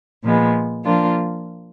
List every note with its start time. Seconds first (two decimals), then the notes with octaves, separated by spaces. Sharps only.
0.23 A#2 F3 G#3 B3
0.85 F3 A#3 D4 F4